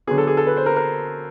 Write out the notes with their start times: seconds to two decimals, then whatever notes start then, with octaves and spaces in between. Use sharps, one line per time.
0.07 D3 F#3 B3 G#4
0.18 A4
0.27 G#4
0.37 A4
0.47 B4
0.57 C5
0.66 A#4
0.76 A#4